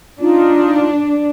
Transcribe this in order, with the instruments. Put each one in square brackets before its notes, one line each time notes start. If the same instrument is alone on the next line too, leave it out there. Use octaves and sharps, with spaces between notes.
[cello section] D4 [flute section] D#4 F4